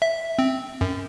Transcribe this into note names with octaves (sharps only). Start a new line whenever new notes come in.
E5
C4
F#2